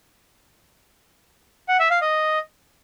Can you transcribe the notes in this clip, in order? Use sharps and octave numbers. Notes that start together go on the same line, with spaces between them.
F#5
E5
F5
D#5